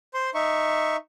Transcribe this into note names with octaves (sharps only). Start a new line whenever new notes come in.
C5 C6
D#4 E5 C#6